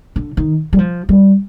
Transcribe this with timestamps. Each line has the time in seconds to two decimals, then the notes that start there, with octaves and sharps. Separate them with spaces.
0.16 D3
0.37 D#3
0.73 G3
0.79 F3
1.09 G3